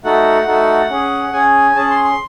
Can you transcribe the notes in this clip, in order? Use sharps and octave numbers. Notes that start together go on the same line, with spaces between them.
A3 D#4 F#4 A4 F#5
A3 D#4 F#4 A4
C#4 G#4
C#4 G#4 G#5
C#4 G#4 A5
C6
C6